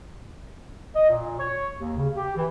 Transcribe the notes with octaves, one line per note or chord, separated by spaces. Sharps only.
D#5
A#2
C#5
D#2
C#3
G4
E3